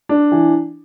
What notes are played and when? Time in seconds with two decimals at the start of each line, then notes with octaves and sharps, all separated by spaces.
0.09 D4
0.32 E3